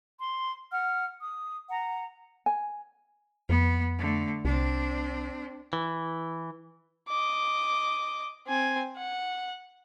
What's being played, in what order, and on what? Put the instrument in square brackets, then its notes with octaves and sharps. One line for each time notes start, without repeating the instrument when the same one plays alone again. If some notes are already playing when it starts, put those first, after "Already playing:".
[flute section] C6
F#5 F6
D#6
F#5 A#5
[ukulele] G#5
[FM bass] F2 [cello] B3
[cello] D3 A3
[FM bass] C2 [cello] C4 D4
[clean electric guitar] E3
[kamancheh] D#5 D6
C4 G#5
F#5